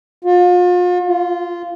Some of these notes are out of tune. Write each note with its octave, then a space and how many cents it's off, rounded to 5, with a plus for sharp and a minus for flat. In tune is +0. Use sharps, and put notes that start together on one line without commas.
F4 +40
F4 -10